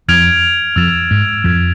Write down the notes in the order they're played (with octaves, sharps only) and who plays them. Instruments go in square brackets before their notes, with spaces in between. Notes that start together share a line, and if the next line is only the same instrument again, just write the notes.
[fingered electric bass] F2 F3 [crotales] F6 G#6 D7 F7
[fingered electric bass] F2 F3 [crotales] E6 A6 E7
[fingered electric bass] G#2 G#3
[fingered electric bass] F2 F3 [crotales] G#6 B6 D7